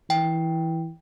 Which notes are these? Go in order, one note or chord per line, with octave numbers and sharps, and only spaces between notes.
E3 G5